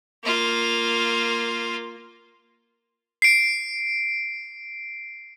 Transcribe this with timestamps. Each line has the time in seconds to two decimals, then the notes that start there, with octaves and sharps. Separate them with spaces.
0.24 A#3 F4
3.22 C7 D7